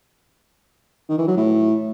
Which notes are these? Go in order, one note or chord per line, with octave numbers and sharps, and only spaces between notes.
D#3
E3
F#3
A2